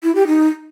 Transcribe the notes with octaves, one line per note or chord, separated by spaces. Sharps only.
E4
G4
D#4